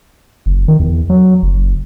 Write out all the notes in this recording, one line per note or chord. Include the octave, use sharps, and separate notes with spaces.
F#1
D#3
E2
F#3
F#1